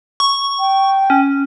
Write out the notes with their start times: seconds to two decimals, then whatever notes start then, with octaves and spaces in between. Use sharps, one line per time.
0.20 C#6
0.59 G5
1.10 C#4